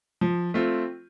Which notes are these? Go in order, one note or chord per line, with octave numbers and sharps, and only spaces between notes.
F3
A3 C4 F4